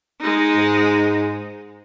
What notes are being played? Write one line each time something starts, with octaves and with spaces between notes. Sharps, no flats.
G#3 D#4
G#2